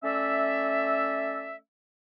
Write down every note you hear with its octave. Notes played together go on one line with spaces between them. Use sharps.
A3 C#4 D5 E5